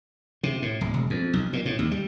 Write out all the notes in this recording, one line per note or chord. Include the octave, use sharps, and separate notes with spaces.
C3
A2
D1
E1
F2
B1
A#2
A2
D#2
G3